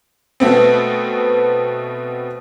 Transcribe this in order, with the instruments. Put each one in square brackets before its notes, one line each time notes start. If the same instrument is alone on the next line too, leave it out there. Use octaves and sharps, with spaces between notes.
[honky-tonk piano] B2 A3 B3 C4